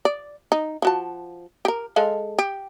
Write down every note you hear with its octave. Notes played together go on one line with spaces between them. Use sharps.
D5
D#4
F3 F#4 A5
G4 A#4
G#3 A4 F5
G4